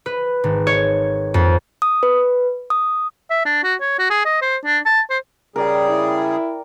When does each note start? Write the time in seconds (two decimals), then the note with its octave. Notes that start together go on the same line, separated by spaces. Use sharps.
0.06 B4
0.44 G#1
0.67 C#5
1.34 F2
1.82 D#6
2.03 B4
2.70 D#6
3.31 E5
3.45 D4
3.64 F#4
3.81 C#5
3.99 F#4
4.10 G#4
4.25 D#5
4.42 C5
4.65 D4
4.86 A5
5.10 C5
5.56 C#3 G3 G#4 A#4 D5 G5
5.89 E4